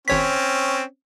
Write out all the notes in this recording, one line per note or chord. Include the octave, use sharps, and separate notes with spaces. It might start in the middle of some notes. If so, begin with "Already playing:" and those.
G#1 C4 C#4 C#5 B6